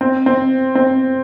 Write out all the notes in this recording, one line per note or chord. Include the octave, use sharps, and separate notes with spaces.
C4
C4
C4